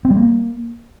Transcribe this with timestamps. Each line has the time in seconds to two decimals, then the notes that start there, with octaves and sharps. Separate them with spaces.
0.05 C4
0.11 G3
0.16 A#3